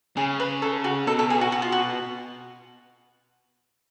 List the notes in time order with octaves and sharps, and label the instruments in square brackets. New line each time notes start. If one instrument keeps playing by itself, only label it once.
[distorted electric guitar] C#3 [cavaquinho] G#4
[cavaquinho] B4
A4
F#4
[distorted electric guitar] B2 [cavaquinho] A4
[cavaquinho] A4
G#4
F#4
F#4
F4
F#4